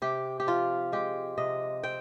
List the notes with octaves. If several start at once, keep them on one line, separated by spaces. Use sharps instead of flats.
C3 G4
G4
F3 F4
G#3 G4
C3 D#5
C4 G5